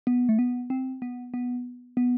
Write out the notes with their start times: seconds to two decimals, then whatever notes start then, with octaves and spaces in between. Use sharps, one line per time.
0.07 B3
0.29 A3
0.39 B3
0.70 C4
1.02 B3
1.34 B3
1.97 B3